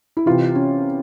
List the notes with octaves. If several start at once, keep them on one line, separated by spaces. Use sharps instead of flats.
E4
C3 E3 F4
C#4